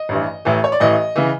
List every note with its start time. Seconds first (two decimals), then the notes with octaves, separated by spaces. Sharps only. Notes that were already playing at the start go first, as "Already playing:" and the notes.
Already playing: D#5
0.09 A1 G2 E3
0.45 A1 A2 E3
0.64 C#5
0.72 D5
0.80 A1 A2 E3 D#5
1.16 C#3 E3